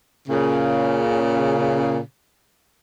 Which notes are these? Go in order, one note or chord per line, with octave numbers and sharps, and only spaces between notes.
A#2 C#3